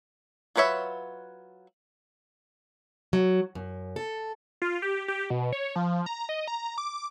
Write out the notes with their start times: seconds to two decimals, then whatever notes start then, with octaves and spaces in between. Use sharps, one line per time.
0.56 F#3 F4 B4 C#5 E5
3.13 F#3
3.55 F#2
3.96 A4
4.62 F4
4.82 G4
5.08 G4
5.30 B2
5.53 C#5
5.76 F3
6.06 A#5
6.29 D#5
6.48 A#5
6.78 D6